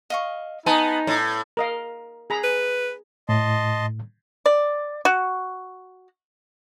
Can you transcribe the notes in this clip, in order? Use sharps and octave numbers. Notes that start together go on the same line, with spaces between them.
D#5 F5 C#6
B3 D#4 G#5 A5 C6
A2
A#4 D#5 F5
G#4 A#5 B5
B4
A2 D#5 A5 C6
D5
F#4